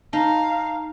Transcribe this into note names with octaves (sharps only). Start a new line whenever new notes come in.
D#4 F5 A5 A#5